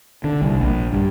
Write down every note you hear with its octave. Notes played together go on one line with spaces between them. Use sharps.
D3
C2
A#1
G2